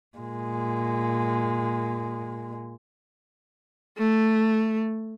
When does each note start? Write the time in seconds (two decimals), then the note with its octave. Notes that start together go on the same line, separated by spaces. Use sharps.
0.18 A#2 G#3
3.97 A3